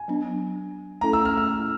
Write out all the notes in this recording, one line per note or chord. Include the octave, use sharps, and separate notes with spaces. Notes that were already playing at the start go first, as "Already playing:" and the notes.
Already playing: G#5
F#3 B3 D4
A3 C#4 E4 A4 A#5
E6
F6
F6